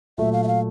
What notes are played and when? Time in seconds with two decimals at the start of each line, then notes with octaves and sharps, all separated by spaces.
0.18 A#2 F#3 A3 E5
0.33 F5
0.44 E5
0.48 F5